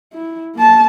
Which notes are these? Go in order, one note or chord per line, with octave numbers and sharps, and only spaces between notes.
E4
A#3 A5